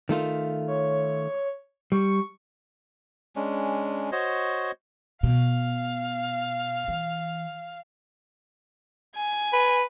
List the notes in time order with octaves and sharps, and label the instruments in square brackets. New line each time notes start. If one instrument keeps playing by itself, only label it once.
[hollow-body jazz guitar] D#3 A3 F4
[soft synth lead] C#5
[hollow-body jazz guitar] G3 [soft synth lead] C#6
[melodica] G#3 C#4 D4
F#4 C5 C#5 D#5
[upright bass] B2 [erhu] F5
[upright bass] E3
[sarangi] G#5
[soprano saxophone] B4